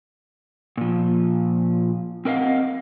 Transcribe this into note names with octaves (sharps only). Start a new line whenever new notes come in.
A#2 F3
C4 A#4 D#5 F5 F#5